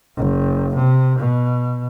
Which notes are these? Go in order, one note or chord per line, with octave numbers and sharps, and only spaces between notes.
F#1
C3
B2